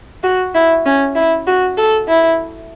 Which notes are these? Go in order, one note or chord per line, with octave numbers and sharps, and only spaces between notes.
F#4
E4
C#4
E4
F#4
A4
E4